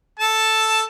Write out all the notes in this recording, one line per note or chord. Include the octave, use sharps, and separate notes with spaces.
A4 A5